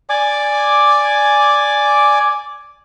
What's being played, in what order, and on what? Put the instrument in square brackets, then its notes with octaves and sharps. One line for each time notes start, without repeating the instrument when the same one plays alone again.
[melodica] D5 G#5 D6